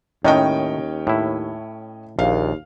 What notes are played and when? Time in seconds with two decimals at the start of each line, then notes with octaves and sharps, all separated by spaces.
0.24 D#2 A2 D#3 C#4 D#5 G5
1.07 A2 E4
2.19 A#1 D#2 F5